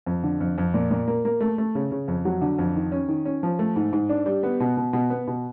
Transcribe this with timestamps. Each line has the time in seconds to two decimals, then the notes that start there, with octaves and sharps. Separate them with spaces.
0.06 F2
0.24 D3
0.40 F2
0.58 F2
0.74 A#2
0.91 A#2
1.08 A#3
1.25 A#3
1.40 A3
1.58 A3
1.75 C#3
1.91 C#3
2.08 F2
2.25 F#3
2.42 D3
2.58 F2
2.76 D#3
2.92 C#4
3.08 D#3
3.25 C#4
3.43 F3
3.59 A3
3.76 G#2
3.93 G#2
4.09 D4
4.26 G3
4.43 B3
4.60 B2
4.77 B2
4.93 B2
5.10 B3
5.27 B2